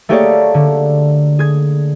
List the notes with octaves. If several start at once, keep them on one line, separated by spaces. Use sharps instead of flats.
A3 A#3 G4 G#4 C#5 D5
D3
G#4 G#6